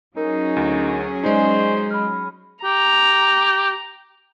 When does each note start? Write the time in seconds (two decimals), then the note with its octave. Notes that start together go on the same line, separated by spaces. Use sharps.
0.17 F#3 C#4 D#4 G#4 A#4
0.56 D2
1.24 G#3 D#4 C5 D5 D#5 G#5
1.90 B5 F6
2.64 G4 A#5